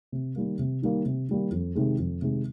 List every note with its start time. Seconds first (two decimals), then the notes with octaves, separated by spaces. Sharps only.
0.12 C3
0.36 D#3 G3 A#3
0.59 C3
0.82 D#3 G3 A#3
1.06 C3
1.28 D#3 G3 A#3
1.52 F2
1.75 C3 D#3 G#3
1.99 F2
2.22 C3 D#3 G#3